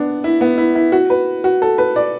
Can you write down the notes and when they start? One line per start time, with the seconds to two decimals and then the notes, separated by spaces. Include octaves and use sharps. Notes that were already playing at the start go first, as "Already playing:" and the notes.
Already playing: B3 D4
0.24 E4
0.41 B3
0.58 E4
0.75 E4
0.92 F#4
1.10 B4
1.44 F#4
1.62 A4
1.78 B4
1.96 D5